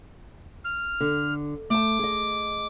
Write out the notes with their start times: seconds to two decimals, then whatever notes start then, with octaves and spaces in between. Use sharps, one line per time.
0.65 F6
1.00 D3
1.70 A3 A5 D6
1.99 G#4 D#5